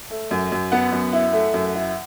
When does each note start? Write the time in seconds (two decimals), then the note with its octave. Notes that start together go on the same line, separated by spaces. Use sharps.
0.10 A3
0.31 F#2
0.52 F#2
0.72 B3 F#5
0.92 F#2
1.13 E4
1.33 A3
1.54 F#2
1.75 E4